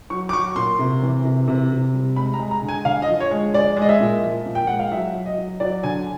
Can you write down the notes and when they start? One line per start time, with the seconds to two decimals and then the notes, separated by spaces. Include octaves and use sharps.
0.10 F#3 C#6
0.29 D6
0.33 F#3 C#6
0.56 A#2 C6
0.79 C3
1.02 E3
1.25 C3
1.48 C3
1.71 C3
1.94 G3
2.16 G#3 B5
2.34 A#5
2.39 G#3
2.51 A#5
2.62 D3
2.69 G#5
2.85 D3 F5
3.02 D#5
3.08 F3
3.20 C#5
3.31 G#3
3.54 G#3 D5
3.77 G#3
3.82 D#5
3.89 E5
4.00 A#2
4.23 F3
4.46 A#2
4.55 G5
4.67 G#3 F#5
4.79 F5
4.91 F#3 E5
5.14 F#3
5.26 D#5
5.38 F#3
5.60 F#3 D5
5.83 D3 G#5